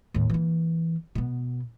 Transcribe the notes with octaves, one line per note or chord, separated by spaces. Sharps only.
D#2 A2
E3 A#3
B2 B3